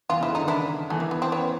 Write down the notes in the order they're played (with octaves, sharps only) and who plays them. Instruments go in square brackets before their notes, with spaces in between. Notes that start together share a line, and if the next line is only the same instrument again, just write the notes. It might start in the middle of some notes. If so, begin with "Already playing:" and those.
[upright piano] E3 [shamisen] F4
[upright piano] C#3 [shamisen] E4
[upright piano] D3
[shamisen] D#4
[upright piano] D#3
[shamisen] D4 E4
[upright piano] E3 [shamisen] A3
[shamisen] A#3
B3
C4
B3 C#4